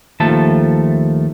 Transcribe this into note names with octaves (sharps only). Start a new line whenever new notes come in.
D#2 F3 A3 A4 A5